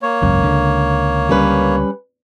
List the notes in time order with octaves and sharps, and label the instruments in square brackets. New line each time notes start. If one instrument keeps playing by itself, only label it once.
[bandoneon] A#3 C#5
[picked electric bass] G#1 C#2 F#2
C#2 D3
[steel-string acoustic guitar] G3 C#4 B4